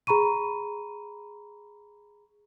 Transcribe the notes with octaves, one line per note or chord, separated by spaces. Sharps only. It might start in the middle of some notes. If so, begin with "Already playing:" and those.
G#4 A#5 B5 C#6 D#7